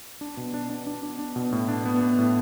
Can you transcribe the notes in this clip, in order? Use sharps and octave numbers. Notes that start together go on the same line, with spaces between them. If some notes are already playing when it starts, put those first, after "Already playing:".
D4
B2
D4
D4
D4
D4
D4
B2
A2
D4
B3
B3
A2